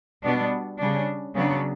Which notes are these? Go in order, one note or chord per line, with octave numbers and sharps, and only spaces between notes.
B2 G3 B3 D4
C#3 G3 D4
C#3 F#3 B3 D4